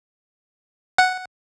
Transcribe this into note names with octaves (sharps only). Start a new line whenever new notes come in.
F#5